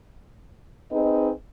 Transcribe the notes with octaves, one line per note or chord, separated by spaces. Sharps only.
C4 D#4 G#4 B4 D#5